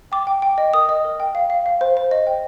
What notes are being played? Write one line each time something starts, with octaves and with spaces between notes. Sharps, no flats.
G5 D6
G5
G5
D#5
A#4 D#6
D#5
A#4
G5
F5
F5
F5
C5
C5
D#5
G5